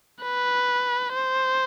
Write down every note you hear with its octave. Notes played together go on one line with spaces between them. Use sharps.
B4
C5